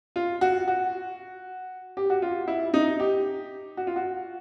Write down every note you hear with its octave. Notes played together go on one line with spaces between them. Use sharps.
F4
F#4
F#4
G4
F#4
F4
E4
D#4
G4
F#4
F4
F#4